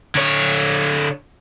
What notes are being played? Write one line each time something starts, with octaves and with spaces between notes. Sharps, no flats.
D3 C#5